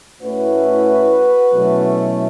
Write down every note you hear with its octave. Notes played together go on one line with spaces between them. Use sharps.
A2 A3 C#4 E4 F#4 B4
B2 F#3 A3 C#4 E4